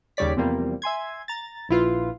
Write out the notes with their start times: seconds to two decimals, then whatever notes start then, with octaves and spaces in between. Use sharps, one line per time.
0.17 D#2 C#3 G3 C#5 D5 B6
0.37 E2 C3 F3 G3 A#3
0.82 E5 G#5 C6 G#6
1.28 A#5 A6
1.69 A#1 E4 F4 B4